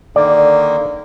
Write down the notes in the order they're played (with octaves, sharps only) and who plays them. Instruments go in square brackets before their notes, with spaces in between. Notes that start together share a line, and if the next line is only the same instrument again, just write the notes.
[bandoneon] D3 D#3 A#3 [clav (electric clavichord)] D5